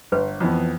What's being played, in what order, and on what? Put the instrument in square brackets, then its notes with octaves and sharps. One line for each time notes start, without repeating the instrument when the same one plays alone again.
[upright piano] G1 [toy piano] B4
[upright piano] F2 E3 B3